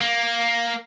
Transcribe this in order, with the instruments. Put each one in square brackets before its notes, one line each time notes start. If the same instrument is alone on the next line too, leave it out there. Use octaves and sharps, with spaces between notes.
[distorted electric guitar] A#3